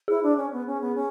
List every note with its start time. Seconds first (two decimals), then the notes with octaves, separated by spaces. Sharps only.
0.08 E4 G#4
0.23 D4
0.37 C#4
0.52 B3
0.66 C#4
0.81 B3
0.95 C#4